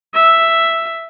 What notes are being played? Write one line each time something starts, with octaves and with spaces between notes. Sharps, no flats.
E5